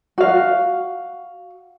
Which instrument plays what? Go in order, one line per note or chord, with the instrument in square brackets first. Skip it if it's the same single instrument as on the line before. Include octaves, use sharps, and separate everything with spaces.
[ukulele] F#4 F5